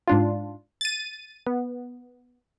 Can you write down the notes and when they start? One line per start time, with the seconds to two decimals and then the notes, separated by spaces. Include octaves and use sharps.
0.08 G#2 D4 F4
0.81 A6 D#7
1.47 B3